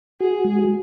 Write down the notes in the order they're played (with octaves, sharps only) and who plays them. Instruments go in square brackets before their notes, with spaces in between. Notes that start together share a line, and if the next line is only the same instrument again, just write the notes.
[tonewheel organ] F#4 [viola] G#4
[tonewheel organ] G#3